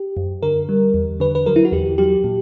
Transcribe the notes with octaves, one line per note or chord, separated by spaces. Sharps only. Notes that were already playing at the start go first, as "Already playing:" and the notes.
Already playing: G4
F#2
D3 A#4
G3
E2
D3 B4
B4
F#3 A#4
E4
F#4
E2 G4
F#3 G4
A#2